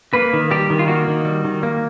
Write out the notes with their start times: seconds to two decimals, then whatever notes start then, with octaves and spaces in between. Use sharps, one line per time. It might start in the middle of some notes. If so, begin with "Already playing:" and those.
0.13 A#3 B4
0.33 D#3
0.51 G3 G4
0.70 D#3
0.79 F4
0.88 A#3 F#4
1.07 D#3
1.25 G3
1.45 D#3
1.63 A#3